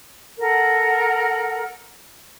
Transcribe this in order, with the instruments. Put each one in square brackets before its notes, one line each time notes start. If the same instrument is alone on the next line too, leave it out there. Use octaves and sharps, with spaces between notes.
[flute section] A4 A#4 F#5